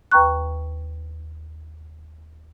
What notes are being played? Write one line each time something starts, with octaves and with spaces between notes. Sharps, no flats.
D#2 B4 G5 A#5 C#6 F#6